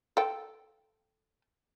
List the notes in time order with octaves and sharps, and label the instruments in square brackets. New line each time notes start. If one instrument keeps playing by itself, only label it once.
[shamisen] A4 G5